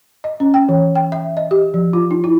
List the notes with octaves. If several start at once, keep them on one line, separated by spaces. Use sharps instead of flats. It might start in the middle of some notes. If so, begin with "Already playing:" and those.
D#5
C#4
G5
E3
G5
E5
D#5
G4
F3
F4
D#4
E4